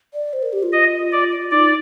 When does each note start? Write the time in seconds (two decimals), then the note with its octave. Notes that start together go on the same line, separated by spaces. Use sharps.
0.14 D5
0.33 C5
0.42 A#4
0.53 G4
0.63 F4
0.73 D#5
1.12 D5
1.51 D#4 D5